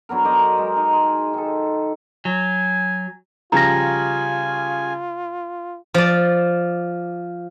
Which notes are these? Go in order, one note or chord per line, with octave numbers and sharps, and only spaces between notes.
D3 F#3 B3 A#4
A#4 C5 D5 D#5
G#3 A#4
D#4
G#4 C6
D#3 A4
F#3 G#5
C#3 F3 G3 F4 G#5 A#5 A#6
F3 D5